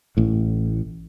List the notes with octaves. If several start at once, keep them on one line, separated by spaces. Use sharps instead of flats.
A1 A2